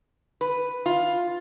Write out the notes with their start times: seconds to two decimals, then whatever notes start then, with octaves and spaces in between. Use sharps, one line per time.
0.41 B4
0.86 F4